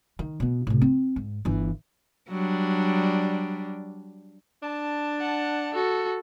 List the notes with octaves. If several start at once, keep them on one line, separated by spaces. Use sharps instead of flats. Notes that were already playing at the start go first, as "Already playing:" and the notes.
D#3
B2 B3
A2 C3
C4
G#2
G1 E3
F#3 G3 D4
D4 A5
F#5
F#4 A4